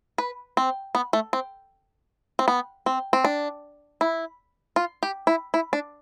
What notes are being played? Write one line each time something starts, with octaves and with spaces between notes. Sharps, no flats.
B4
C4
B3
A3
C4
C4
B3
C4
C4
D4
E4
F4
G4
E4
E4
D4